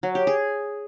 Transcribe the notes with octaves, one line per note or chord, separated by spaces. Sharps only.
F#3
G4
G#4